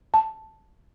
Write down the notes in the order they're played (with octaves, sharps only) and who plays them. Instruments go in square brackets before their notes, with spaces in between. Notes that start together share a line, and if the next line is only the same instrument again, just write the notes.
[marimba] A5